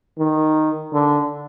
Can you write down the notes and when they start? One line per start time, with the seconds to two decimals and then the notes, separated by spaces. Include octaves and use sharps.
0.19 D#3
0.93 D3